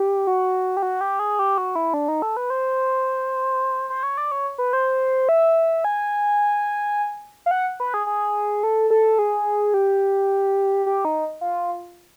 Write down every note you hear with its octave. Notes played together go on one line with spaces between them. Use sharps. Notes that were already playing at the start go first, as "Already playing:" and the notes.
Already playing: G4
F#4
G4
F#4
G4
G#4
G4
F#4
E4
D4
D#4
A4
B4
C5
C5
C#5
D5
C#5
B4
C5
E5
G#5
F5
F#5
B4
G#4
G#4
A4
A4
G#4
G4
G4
D#4
F4